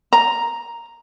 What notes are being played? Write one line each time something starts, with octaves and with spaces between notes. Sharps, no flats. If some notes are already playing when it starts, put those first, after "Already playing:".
A#5